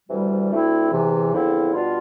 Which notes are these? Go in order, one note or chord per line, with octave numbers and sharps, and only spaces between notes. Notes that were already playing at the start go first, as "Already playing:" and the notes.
D2 C3 E3 G3
D2 D3 A3 C4 E4
E2 C3 E3
E2 D3 F3 C4 E4
B2 G3 D4 F4